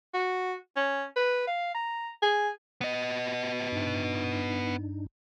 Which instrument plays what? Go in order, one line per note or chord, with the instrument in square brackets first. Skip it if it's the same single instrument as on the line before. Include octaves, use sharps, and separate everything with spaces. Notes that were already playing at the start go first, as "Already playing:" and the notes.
[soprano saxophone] F#4
C#4
B4
F5
A#5
G#4
[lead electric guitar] B3 D#5
[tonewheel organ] G2 D4 D#4